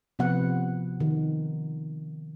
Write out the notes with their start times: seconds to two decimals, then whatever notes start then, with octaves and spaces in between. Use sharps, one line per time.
0.19 C3 F3 B3 F#5
1.00 D#3